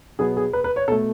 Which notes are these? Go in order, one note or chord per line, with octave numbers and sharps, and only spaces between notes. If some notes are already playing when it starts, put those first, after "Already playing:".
B2 F#3 B3 G#4
G#4
B4
B4
C#5
B2 A3 A4